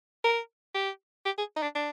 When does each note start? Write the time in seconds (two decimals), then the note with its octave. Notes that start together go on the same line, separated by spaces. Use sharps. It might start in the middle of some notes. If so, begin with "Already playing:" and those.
0.25 A#4
0.75 G4
1.26 G4
1.38 G#4
1.56 D#4
1.63 D4
1.75 D4